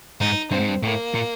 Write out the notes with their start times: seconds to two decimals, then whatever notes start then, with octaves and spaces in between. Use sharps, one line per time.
0.20 G#2 D#4
0.51 G2 C4
0.60 G#2
0.68 G2
0.83 A2 A#3
1.14 A#2